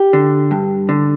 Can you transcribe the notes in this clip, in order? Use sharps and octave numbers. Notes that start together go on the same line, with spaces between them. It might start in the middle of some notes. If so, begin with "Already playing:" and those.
Already playing: G4
D3
G2
D3